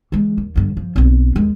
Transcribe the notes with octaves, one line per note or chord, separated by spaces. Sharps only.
E3 G#3
D#2
G2 D3
F3
B1 C4
D#2 G#3